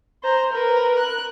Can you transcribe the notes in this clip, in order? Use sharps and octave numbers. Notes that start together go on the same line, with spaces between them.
C5 A#5
A#4 B4
F#6